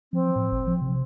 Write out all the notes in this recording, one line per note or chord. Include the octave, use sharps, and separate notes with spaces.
F3 C4
A2
G#1
F3
C3